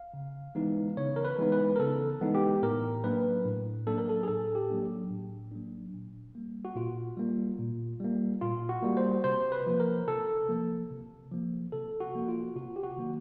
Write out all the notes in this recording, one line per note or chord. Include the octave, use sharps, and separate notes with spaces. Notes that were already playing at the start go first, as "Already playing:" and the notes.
Already playing: F5
C#3
E3 G#3 B3 D#4
C#3 C#5
A#4
B4
E3 G#3 B3 D#4
B4
A#4
C#3 A4
E3 G#3 B3 D#4
G4
A2 A#4
F#3 A#3 D4 B4
A2
F#3 A#3 D4 A4
A#4
A4
G#4
A2 A4
G4
F#3 A#3 D4
A2
F#3 A#3 D4
A#2
G3 A#3
F#4
A#2 F4
G3 A#3
A#2
G3 A#3
A#2 F4
F#4
G3 A#3
C5
C3 C5
B4
F3 A#3
A#4
C3 A4
F3 A#3
C3
F3 A#3
C3 A4
F#4
F3 A#3
F4
C3 F#4
G4
F#4
D#3 F#3 A#3